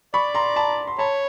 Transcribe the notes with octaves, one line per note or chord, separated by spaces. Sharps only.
D5 B5 C#6
A#5 C6
A5 B5
C6
C#5 A5 B5